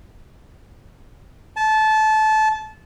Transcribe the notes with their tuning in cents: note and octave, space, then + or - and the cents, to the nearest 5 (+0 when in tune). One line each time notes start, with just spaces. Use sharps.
A5 -20